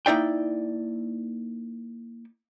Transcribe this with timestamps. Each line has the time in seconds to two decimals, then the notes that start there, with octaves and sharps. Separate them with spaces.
0.06 A#3 D#4 E4 D5 G5